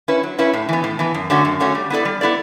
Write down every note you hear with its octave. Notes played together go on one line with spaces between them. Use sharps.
C#4 E4 B4
F#3
C#4 E4 B4
A2
E3 B3
A2
E3 B3
F#2
D3 A3 C#4 F#4
F#2
D3 A3 C#4 F#4
G3
B3 E4 A4 D5
G3
B3 E4 A4 D5